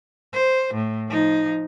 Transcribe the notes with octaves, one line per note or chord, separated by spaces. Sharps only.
C5
A2
F3 D#4